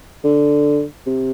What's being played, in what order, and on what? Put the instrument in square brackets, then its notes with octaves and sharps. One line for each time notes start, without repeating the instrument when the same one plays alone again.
[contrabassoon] D3
C3